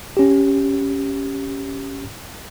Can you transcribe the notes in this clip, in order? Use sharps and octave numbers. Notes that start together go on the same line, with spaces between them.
C#4 G4